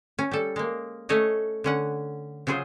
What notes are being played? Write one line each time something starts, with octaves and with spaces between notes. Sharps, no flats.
C#4
G3 A4
G#3 A#3
A3 C#4 A4 C#5 D#5
D3 C#4 F#5
C#3 F#3 F4 G#4 C5